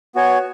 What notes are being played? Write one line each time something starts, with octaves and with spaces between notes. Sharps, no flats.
B3 F#4 C#5 G#5